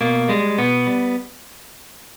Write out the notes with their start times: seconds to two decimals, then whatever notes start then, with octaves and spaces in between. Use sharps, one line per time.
0.01 B2 A#3
0.29 G3 G#3
0.58 B2 B3
0.87 G3